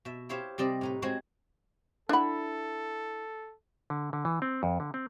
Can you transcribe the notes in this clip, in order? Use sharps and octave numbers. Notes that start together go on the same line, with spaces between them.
B2 E5
E4 G4 C5 C#5 E5 F5
C3 G3 C4 D5 D#5
A2 D#4 B4
G#3 C4 F#4 C5 C#5 G#5
D4 E4 A4 F#5 B5
D3
D3
E3
C4
F2
D3
C4